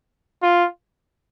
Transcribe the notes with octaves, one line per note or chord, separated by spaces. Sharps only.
F4